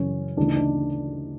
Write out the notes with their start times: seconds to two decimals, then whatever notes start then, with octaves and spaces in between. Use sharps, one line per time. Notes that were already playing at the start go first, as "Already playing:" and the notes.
Already playing: F#2 C#3 E3 C#4
0.37 D2 C#3 E3 D4
0.47 D#4
0.56 D4